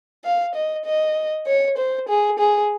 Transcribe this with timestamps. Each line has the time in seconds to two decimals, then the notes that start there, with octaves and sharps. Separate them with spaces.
0.25 F5
0.55 D#5
0.85 D#5
1.47 C#5
1.77 C5
2.08 G#4
2.39 G#4